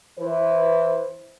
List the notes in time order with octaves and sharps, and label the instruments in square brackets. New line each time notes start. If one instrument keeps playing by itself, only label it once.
[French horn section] E3 E4 B4 C5